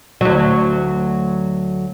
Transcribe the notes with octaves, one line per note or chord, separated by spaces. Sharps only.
D2 F#3